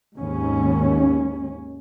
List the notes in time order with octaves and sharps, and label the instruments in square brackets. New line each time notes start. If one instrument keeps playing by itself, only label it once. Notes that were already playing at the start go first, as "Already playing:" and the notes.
[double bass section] G#1 D#2 G#2 C#4